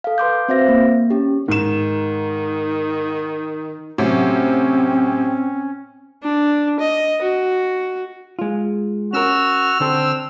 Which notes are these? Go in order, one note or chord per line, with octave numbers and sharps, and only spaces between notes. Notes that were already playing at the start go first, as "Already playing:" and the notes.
A4 F5
B4 C6 D6 G6
C4 F#4 C5 E5 F5 A#6
A#3
C#4 G4
G#2 D#3 E7
A2 C3 F#3 C4 C#4
D4
D#5
F#4
G#3 F4
C#4 F#4 A#4 E6 F6
D3 C4 A4